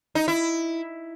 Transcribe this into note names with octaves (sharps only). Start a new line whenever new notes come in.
D#4
E4